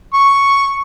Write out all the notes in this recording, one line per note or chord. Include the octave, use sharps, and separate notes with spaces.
C#6